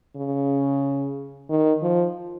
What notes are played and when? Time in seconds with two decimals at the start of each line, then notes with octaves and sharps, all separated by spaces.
0.16 C#3
1.49 D#3
1.82 F3